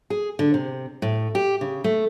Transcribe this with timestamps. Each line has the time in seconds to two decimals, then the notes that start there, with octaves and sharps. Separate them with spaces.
0.10 G#4
0.39 D3
0.54 C3
1.02 A2
1.35 G4
1.61 C#3
1.84 A3